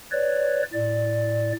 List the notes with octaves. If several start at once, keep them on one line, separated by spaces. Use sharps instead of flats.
B4 C#5 D5
A2 D5